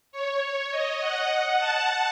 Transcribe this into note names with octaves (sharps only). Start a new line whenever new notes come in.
C#5
D#5
F#5
A5